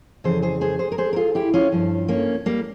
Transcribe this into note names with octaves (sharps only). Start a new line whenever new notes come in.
F2 C#3 E3 G#4 C5
G#4 C5
G#4 C5
G#4 C5
A#4
G#4 C5
A#4
F4 G#4
E4 G4
C#4 F4
G2 F3
A#3 C#4
G3 A#3